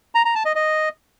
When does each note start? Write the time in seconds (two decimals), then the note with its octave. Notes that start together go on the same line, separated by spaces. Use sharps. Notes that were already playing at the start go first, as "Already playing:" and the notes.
0.15 A#5
0.25 A#5
0.35 A5
0.45 D#5
0.55 D#5